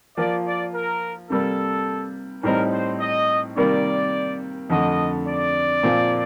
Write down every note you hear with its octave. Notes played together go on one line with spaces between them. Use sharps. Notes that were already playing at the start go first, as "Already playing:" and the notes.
F3 A#3 F4 D5
D5
A#4
C3 G3 A#3 A4
A2 G3 C4 D#4 A#4
C5
D#5
C3 D#3 G3 A#3 D5
F2 D3 A3 D#5
D5
A#2 F3 C4 F4